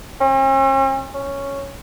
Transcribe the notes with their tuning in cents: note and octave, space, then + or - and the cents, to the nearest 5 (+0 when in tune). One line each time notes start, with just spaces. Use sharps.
C#4 -45
C#4 +0